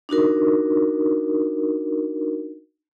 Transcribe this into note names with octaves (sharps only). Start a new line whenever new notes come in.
D4 D#4 F#4 A#4